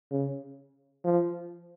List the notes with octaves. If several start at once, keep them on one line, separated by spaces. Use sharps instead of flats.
C#3
F3